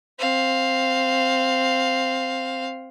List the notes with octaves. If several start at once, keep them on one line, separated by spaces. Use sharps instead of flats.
C4 F5